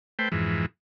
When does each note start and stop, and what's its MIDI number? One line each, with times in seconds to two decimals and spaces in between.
0.19 0.29 57
0.19 0.29 71
0.19 0.29 72
0.19 0.29 79
0.32 0.66 41
0.32 0.66 44
0.32 0.66 52